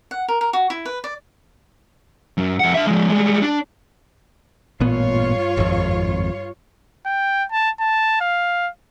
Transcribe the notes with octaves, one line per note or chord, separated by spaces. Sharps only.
F#5
A#4
A#4
F#4
E4
B4
D5
F#2
F2 F#5
D4 E5
F3 G#3
G3 G#3
D4
A1 G2 A#2 B3 F4 C#5
G#1 F2
G5
A5
A5
F5